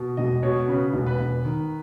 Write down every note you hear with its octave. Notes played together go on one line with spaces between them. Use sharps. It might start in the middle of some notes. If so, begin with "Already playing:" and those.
Already playing: B2
E1 D#5
B2 C#5
C#3 B4
E1
B4
E1
D#3